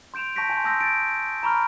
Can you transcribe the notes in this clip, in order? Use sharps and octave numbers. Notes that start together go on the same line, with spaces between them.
C6 G6 D7 E7 F7
A5 C#6 G6 A#6 B6 D7
G#5 A5 C6 G6
A5 C6 D#6 E6 G6 A#6
G6 A6 D7
A#5 B5 C#6 F6